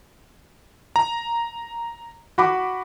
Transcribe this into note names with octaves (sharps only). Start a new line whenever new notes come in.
A#5
F#4 B5 D6